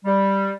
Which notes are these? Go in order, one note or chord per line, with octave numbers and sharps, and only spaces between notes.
G3